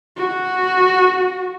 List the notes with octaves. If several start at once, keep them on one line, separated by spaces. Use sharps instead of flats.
F#4